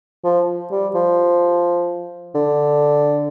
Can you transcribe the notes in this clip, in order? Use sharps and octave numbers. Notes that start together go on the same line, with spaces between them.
F3
G3
F3
D3